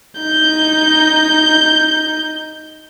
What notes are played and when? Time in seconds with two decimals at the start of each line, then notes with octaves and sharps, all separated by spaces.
0.21 D#4 G6